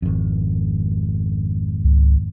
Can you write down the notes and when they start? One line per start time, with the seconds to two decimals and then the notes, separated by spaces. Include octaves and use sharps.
0.02 G#1 F2
1.84 C#2